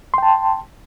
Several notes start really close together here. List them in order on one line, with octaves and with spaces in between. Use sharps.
C6 G5 A5